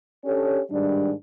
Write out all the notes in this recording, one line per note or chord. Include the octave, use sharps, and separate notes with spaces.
C#4 D4 G4 A4 C#5
G#2 D#3 G3 D4